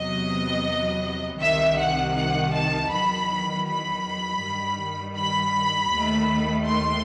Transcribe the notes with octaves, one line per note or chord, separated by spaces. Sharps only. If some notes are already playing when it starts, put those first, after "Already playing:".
Already playing: E2 C3 F#3 B3 D#5
C2 C3 D#3 E5
F#5
F#5
A5
E2 D#3 F#3 B5
B5
G2 D#3 G3
B5
D#2 D#3 A3
C6